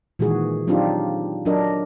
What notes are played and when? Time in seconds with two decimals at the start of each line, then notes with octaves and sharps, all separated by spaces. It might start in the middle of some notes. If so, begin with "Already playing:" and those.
0.19 A#2 D#3 E3 G#3 F#4 G#4
0.67 F#3 C4 D4 D#4 F4 G4
1.45 F#3 D4 A#4 D#5